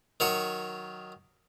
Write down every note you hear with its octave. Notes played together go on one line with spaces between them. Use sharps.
D#3 F#3 C#5 C#6